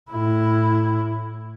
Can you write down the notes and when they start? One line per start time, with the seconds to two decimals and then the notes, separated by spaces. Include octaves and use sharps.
0.10 A2 E4